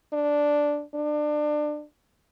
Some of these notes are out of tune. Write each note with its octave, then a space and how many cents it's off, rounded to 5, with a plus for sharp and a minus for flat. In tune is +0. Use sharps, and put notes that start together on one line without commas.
D4 -5
D4 +25